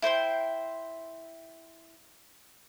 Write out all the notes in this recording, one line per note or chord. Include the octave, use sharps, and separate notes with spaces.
E4 C5 G5 C6